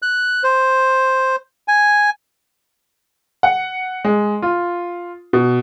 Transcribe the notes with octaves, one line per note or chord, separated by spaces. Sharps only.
F#6
C5
G#5
F#5
G#3
F4
B2